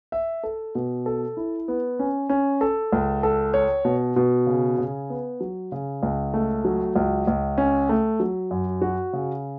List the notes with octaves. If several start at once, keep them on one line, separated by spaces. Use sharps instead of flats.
E5
A4
B2
A4
E4
B3
C#4
C#4
A4
C#2
A4
C#5
B2
B2
C#3
C#3
B3
F#3
C#3
C#2
A3
F#3
C#2
C#2
C#4
A3
F#3
F#2
F#4
C#3